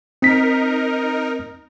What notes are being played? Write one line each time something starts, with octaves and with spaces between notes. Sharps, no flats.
C4 D#4 A#4 B6